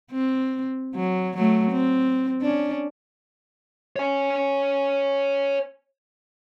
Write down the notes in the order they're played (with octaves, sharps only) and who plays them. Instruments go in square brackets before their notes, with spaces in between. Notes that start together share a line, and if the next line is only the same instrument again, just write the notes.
[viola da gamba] C4
F#3
F#3 A3
C4
C#4 D4
[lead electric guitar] C#5 G#5